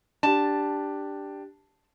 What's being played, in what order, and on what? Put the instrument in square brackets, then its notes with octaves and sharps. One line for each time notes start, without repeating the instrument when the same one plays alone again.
[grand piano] D4 G4 [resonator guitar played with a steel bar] A5